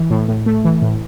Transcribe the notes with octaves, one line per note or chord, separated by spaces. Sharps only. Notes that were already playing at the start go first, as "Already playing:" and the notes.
Already playing: E3
A2
A2
A3
E3
A2